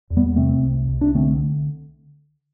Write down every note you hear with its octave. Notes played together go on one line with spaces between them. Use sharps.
E2
G3 B3
C3 A3 C4
C2
C2
D4
D3 A3 C4